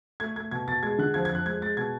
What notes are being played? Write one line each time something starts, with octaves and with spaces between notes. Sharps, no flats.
A3 G#6
A3 G#6
B2 G#6
B2 A6
G#3 G#6
D3 F#6
F3 G#6
G#6
F2 F#6
G#3 G#6
G#3 A6
B2 G#6